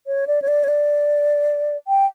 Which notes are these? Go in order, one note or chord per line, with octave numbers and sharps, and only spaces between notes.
C#5
D5
C#5
D5
C#5
D5
G5